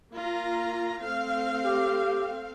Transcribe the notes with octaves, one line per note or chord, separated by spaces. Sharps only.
A#3 F4 A#5
A3 C4 F5
G4